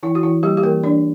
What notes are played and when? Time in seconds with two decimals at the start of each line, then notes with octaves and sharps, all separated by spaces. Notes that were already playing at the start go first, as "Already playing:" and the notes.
0.03 E3 E4
0.15 F#4
0.23 E3 E4
0.43 G3 A#3 G4
0.57 G4
0.63 E3 A#3 A#4
0.83 E3 D4 D5